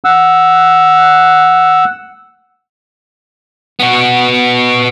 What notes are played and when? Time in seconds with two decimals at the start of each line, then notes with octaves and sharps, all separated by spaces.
0.04 F#5 E6
3.80 B3 F#4